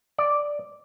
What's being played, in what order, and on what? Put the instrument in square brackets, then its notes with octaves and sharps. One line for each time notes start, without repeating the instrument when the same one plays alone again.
[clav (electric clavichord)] D5